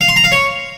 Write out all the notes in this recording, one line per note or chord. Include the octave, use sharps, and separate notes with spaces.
F5
C6
A#5
F5
C#5